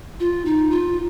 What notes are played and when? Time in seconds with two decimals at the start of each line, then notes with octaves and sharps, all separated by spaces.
0.20 F4
0.45 D#4
0.71 F4